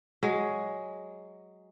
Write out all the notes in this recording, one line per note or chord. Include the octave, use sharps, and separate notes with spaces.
F#3 G#3